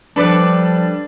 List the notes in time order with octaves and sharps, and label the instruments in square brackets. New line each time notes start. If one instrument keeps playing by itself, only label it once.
[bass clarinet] F3 [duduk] G3 [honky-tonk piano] D4 [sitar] A4 B4 D5